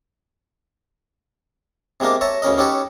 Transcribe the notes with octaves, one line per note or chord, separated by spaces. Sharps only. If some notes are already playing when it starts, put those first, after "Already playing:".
C3 G#3 A#3 D4 A#4
C#5 E5 A5 A#5
D2 C#3 C#4 A#4 D#5
C#4 D#4 G4 A4 B4 C#5